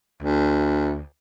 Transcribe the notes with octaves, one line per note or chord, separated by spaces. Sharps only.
D2